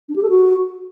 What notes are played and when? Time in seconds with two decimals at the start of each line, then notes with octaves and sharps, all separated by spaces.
0.09 D4
0.15 G4
0.22 A4
0.29 F#4